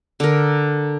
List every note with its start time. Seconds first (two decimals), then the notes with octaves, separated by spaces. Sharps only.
0.20 D3 A#4